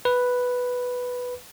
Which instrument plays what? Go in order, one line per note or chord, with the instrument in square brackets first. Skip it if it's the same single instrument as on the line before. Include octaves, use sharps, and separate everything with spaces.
[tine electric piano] B4